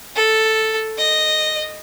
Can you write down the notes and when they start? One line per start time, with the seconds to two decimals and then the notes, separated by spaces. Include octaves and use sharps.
0.16 A4
0.98 D#5